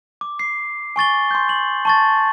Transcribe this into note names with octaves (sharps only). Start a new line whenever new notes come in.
D6
C7
G#5 C#6 A6 G7
C6 G6
F#7
A5 C#6 A6